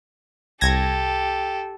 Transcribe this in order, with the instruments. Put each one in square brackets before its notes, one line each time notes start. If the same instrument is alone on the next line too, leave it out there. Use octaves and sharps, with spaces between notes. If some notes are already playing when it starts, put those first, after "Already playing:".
[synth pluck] C2 G#6 A#6 [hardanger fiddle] G4 A4